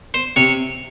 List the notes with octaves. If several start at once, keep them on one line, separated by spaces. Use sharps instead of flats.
C5
C3 C#5